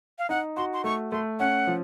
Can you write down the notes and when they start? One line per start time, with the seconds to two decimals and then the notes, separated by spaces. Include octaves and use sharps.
0.19 F5
0.29 D#4 F#5
0.57 F#4 C6
0.73 C6
0.84 A3 C#6
1.12 A3 C6
1.39 C#4 F#5
1.67 F3